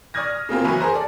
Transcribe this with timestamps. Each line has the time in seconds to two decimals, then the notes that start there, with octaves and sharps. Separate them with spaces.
0.14 D5 C#6 D#6 F6 G#6 A#6
0.30 A#6
0.49 C#3 A#3 C4 F4
0.64 D#2 E3 F#3 B4 C#6
0.80 G#4 A#4 C5 A#5
0.94 A4 D5